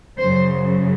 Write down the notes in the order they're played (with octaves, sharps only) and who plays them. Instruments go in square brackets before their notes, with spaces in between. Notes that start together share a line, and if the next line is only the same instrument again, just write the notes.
[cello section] F#2 C#3 F#3 C5